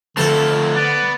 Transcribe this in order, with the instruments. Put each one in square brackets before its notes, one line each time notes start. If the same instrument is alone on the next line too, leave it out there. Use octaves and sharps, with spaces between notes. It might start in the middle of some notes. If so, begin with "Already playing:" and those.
[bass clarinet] D3 [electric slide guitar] F3 A3 C4 [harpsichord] A4 A5
[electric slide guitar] B3 [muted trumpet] D5